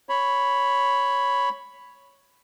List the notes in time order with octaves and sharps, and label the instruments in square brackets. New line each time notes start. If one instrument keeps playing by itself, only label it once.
[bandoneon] C#5 B5